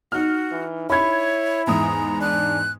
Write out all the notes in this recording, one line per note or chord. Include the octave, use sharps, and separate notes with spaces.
D#4 F#4 F6
E3
E4 C#5 B5 G#6
E2 G#2 A#5 D#6
D4 F#6